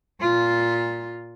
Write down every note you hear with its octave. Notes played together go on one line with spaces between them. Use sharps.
A#2 F4